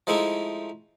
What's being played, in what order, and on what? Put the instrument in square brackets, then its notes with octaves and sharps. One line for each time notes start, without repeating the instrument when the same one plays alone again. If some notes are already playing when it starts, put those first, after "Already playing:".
[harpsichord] F3 G#3 A3 D#4 E4